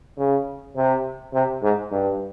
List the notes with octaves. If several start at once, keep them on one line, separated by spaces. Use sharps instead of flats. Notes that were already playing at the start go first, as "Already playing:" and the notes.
C#3
C3
C3
G#2
G2